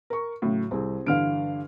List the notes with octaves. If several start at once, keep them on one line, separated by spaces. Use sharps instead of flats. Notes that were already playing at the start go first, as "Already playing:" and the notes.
A#4 C#6
A2 C#3 F#3
C2 C4 G#4
G2 D3 E3 F5 F6 D7